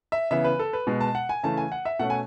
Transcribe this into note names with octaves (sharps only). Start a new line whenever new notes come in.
E5
C#3 E3 B3 E5
B4
A4
B4
B2 G#3 B3
A5
F#5
G#5
C#3 E3 A3 A5
G#5
F#5
E5
B2 A3 C#4 F#5
G#5